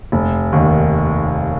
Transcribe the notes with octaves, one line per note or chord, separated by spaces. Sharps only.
F1
D#2 D#3